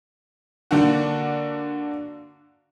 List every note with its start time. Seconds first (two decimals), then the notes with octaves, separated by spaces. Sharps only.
0.71 D3 A#3 D4 F#4